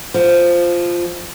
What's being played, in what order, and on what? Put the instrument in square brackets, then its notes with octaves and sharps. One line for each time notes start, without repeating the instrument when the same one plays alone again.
[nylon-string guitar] F3